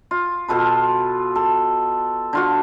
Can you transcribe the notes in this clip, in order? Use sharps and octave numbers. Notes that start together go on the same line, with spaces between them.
F4
B2 F4 A4 B4
A4
D3 F4 F#4